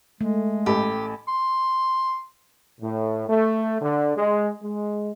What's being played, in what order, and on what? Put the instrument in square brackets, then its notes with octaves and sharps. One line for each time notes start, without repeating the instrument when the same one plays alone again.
[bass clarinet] G#3 [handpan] A3
[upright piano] A1 A4 B5 [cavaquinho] G4
[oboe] C6
[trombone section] A2
A3
D3
G#3
G#3